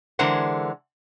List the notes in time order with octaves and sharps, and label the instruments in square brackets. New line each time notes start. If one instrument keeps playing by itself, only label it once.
[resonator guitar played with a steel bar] D3 E3 G#3 A#4 C5 F#5